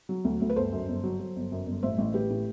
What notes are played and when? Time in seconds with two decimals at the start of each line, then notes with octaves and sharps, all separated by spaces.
0.09 F#3
0.25 D2
0.41 D2
0.50 B4
0.56 G1 A4 C5
0.72 F#2
0.88 G1
1.03 F#3
1.20 F#3
1.36 G1
1.52 F#2
1.67 G1
1.83 A1 C5 E5
1.98 A1
2.14 A1 G4 B4
2.30 A2